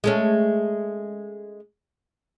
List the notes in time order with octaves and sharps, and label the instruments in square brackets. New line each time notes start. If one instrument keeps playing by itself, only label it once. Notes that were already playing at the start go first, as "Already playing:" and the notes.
[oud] G#3 A3 C#4